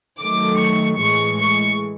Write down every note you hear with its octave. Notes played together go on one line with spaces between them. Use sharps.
D#3 F#3 A3 D6
C#6
A2 E3 G#3 C#6
C#6